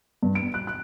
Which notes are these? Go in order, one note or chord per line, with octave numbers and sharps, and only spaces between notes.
G2
D7
F#6
F#6